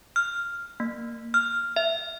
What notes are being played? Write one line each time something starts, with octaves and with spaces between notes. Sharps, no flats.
F6
A#3
F6
E5